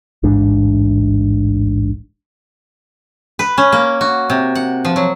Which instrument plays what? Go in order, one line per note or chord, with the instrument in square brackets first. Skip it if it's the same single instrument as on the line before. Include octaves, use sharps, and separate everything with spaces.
[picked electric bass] D1 A1 G#2 D4
[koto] B4
C#4
A#3
F#4
C3
F#5
F3
F#3